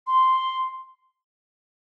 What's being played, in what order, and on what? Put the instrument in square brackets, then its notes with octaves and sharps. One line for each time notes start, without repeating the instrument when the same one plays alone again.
[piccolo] C6